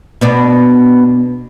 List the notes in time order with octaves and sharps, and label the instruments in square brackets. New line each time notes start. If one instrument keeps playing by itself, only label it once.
[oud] B2 B3 D4